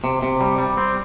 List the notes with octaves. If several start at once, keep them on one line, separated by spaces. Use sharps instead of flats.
C3
C3
G3
G3
C4